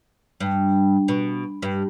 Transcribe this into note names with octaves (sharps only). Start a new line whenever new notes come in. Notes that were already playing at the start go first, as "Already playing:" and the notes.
G2
B2
G2